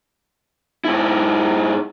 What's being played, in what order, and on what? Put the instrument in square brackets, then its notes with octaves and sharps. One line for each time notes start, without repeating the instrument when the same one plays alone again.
[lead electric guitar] G#2 E4